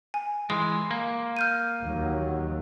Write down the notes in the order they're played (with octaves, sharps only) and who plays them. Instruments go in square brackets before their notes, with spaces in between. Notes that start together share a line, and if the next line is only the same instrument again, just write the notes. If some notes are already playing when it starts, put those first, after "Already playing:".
[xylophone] G#5
[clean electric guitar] E3 G#3 [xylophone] C6
[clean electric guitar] A#3
[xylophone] F6 G6 D#7
[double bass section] D#2 F#3